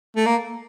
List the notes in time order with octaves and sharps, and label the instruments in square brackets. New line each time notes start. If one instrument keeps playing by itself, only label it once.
[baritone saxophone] A3
A#3